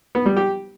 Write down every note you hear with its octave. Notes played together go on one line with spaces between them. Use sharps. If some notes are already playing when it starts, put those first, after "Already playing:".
B3
G3
G4